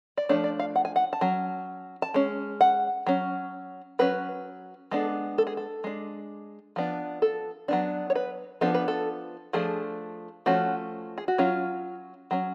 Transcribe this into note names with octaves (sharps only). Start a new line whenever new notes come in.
D5
F3 A3 D4 C#5
D5
F5
F#5
G#5
F#5
A5
F#3 C#4
A5
G#3 C#4
F#5
F#3 C#4
F#3 C#4 B4
G#3 B3 D4 A4
A4
G#4
A4
G#3 D4
F3 B3 D4
A4
F#3 B3 D4
C#5
B4
F3 B3 D4 A4
B4
A4
F3 A3 D4 G#4
F3 A3 C#4 F#4
G#4
F#4
F#3 C#4 F4
F#3 C#4